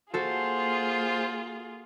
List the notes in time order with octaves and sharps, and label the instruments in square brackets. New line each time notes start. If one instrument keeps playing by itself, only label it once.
[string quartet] A#3 F4 G#4 [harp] F#4 A4 [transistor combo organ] C5